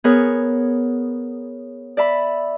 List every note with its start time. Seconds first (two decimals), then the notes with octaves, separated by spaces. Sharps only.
0.04 B3 G#4 A#4 C#5
1.97 D5 E5 B5